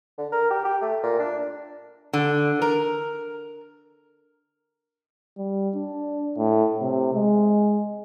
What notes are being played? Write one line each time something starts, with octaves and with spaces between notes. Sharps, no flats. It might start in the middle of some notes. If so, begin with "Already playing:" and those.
D3
A#4
G4
G4
A3
A#2
D4
D3
A#4
G3
D4
A2
C3
G#3